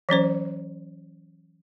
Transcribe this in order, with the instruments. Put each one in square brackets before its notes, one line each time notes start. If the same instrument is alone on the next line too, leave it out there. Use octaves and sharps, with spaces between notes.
[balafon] E3 F#3 C#4 C5